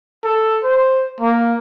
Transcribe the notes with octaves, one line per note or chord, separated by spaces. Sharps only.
A4
C5
A#3